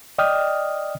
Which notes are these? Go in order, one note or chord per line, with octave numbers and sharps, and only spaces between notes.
D5 D#5 G5 D#6 F6